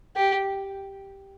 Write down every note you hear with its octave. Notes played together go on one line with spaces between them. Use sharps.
G4